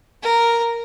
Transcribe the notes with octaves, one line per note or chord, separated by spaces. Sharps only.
A#4